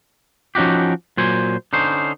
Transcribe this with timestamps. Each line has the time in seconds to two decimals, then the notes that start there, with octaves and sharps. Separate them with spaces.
0.55 F3 C#4 D#4 F#4 G4
1.17 A#2 F#3 C5 G#5
1.73 D3 C#4 D#4 C5